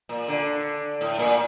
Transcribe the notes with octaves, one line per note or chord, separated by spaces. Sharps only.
A#2
D3
A2
A#2